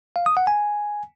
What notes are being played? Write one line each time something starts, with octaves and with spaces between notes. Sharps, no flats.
F5
D#6
F#5
G#5